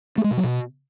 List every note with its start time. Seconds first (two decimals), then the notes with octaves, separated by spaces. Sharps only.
0.18 A3
0.24 G#3
0.31 B2
0.37 F#3
0.44 B2